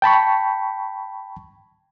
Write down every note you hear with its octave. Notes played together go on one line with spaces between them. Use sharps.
G5 A5 B5 C#6